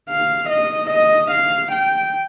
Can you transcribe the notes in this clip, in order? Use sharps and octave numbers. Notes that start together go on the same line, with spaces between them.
F5
D#5
D#5
F5
G5